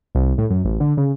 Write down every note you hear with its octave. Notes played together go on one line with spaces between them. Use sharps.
C2
A2
F#2
A1
D3
C#3